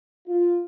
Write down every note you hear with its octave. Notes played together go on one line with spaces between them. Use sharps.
F4